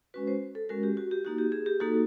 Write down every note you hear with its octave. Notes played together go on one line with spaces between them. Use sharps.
G#3 C#4 F#4 B4
C5
A4
G#3 C#4 F#4 A#4
G4
F#4
G4
A#3 D#4 F#4
G4
G#4
G4
A#3 D#4 F#4 A4